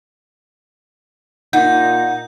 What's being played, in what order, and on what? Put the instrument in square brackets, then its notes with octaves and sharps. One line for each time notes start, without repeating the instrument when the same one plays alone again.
[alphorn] A#2 [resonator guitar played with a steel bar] D#4 [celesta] F#5 [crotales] G6